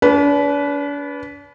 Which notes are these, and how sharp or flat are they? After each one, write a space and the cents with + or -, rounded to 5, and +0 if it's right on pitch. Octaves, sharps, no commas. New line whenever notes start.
D4 -40 B4 +0